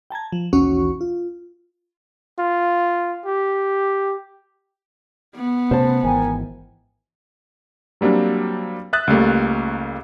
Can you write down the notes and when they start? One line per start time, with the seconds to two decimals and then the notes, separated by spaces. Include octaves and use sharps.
0.10 G5 A5 A#5 G#6
0.32 F3
0.53 A#1 D#2 E3 C#4 F#4 C#6
1.01 F4
2.39 F4
3.25 G4
5.35 B3
5.71 C3 A3 C#4 C5 A5
6.03 G#1 E3 A#4 G5 G#5
8.01 F#3 G3 A#3 C4 D4
8.93 E5 D#6 F#6 A6
9.07 C#2 G3 A3 A#3